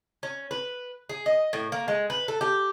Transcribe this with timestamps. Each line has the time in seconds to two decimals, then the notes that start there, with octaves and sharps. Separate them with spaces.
0.23 C#4
0.51 B4
1.09 G#4
1.26 D#5
1.53 A2
1.72 A#3
1.88 G#3
2.10 B4
2.28 A4
2.41 G4